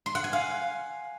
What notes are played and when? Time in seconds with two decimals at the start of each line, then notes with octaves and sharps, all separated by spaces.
0.06 C6
0.15 F#5
0.24 G#5
0.33 F5